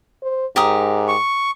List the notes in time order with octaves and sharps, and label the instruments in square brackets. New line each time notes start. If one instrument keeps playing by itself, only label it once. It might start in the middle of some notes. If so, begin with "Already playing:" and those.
[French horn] C5
[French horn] G#2 [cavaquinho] G4 A#4 D#6
[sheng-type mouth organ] C#6